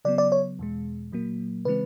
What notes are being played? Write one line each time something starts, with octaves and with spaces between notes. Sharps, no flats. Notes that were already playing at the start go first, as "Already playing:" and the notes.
C#3 F#3 B3 D5
D5
C#5
E2 B2 G#3
A#2 F#3 A#3
C#3 E3 G#3 C4 B4